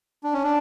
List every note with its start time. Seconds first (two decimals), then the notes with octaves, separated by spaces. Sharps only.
0.24 D4
0.33 C#4
0.44 D4